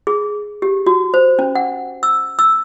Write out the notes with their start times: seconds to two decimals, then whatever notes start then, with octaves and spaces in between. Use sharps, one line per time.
0.07 G#4
0.62 G4
0.86 F#4
1.14 C5
1.39 C#4
1.55 F#5
2.03 E6
2.39 E6